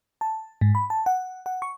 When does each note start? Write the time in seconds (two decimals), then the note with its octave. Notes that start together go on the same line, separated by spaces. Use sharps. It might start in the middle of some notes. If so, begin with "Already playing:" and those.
0.21 A5
0.61 G#2
0.75 B5
0.90 A5
1.06 F#5
1.46 F#5
1.62 C#6